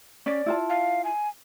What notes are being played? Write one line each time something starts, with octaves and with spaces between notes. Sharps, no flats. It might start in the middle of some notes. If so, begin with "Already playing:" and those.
C#4 D5
E4 F4 A5
F5
G#5